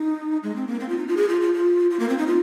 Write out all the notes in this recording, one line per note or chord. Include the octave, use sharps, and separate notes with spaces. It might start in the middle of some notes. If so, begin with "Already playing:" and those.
Already playing: D#4
G#3
C4
A#3
C4
F4
D#4
F4
G#4
F4
F4
F4
F4
A#3
C4
D#4
F4